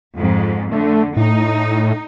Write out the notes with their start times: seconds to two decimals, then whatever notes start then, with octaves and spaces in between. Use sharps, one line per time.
0.16 F2 G#2
0.72 D3 A3
1.17 A2 D#4